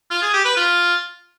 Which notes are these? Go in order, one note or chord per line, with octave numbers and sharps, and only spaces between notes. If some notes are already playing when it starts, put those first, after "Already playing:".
F4
G#4
G4
B4
F4